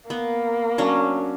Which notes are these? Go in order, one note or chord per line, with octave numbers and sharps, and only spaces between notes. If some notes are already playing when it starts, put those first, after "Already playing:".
A#3 B3
F#3 C#4 D4